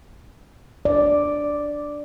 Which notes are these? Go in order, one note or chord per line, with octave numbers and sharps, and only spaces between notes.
D5